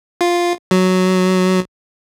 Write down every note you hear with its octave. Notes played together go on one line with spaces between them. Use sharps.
F4
F#3